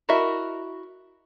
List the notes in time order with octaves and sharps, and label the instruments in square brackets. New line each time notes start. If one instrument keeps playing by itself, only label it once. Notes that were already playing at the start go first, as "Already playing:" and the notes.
[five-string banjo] E4 F#4 A#4 D#5 E5